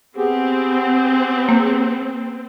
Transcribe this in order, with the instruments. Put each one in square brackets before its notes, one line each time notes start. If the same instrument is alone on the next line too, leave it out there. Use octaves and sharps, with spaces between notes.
[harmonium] B3 G4 G#4 [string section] C4
[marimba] A#3